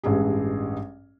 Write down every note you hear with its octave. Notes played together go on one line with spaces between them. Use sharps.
A1 G2 G#3 G#4